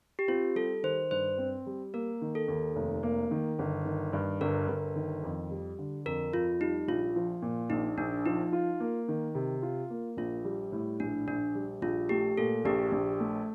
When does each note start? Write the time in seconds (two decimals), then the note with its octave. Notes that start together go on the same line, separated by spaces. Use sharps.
0.19 G4
0.28 C4 F4
0.55 G3 A4
0.83 D#3 C5
1.11 G2 C5
1.38 C4
1.66 G3
1.94 A#3 A#4
2.21 D#3
2.35 A4
2.48 D#2
2.76 F1
3.03 A#3
3.31 D#3
3.59 G1
3.85 D#3
4.13 G2
4.41 G1 A#4
4.68 G1
4.96 D#3
5.24 F2
5.51 G3
5.79 D3
6.05 F2 A#4
6.33 F2 F4
6.61 G3 D#4
6.88 A#1 F4
7.16 F3
7.42 A#2
7.70 A#1 D#4
7.98 A#1 D4
8.26 F3 D#4
8.53 F4
8.80 A#3
9.08 D#3
9.35 C3
9.62 F4
9.90 A#3
10.17 A#1 F4
10.45 G3
10.72 A2
11.00 A#1 D4
11.27 A#1 D4
11.55 G3
11.82 A#1 F4
12.09 A3 G4
12.37 A#2 A4
12.65 A#1 G4
12.92 A#1
13.20 A3